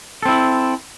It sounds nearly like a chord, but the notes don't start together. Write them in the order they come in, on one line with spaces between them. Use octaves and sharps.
A4 C4 E4